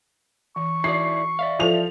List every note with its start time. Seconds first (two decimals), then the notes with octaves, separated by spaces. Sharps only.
0.56 E3 C#6
0.84 E3 D#4 E4 F#4 A4 D5 C7
1.39 D5 E5 F5
1.59 F3 E4 A4 C#5 F7